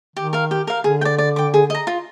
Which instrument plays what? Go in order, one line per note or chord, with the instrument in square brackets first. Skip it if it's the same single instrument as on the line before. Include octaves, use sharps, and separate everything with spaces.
[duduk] D#3 [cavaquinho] G4
[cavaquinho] A#4 F5
G4
A#4 F5
[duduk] D3 [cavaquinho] G#4
[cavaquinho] G5
D5
D5
G5 D6
G#4
D#5 A#5
F4